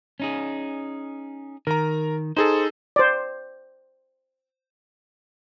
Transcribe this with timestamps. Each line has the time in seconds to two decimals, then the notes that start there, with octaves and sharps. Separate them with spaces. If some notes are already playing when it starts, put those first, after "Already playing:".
0.20 C#4 D#4 G#4
1.67 D#3 A#4 A#5
2.37 D#4 G#4 A4 C5
2.96 C5 D5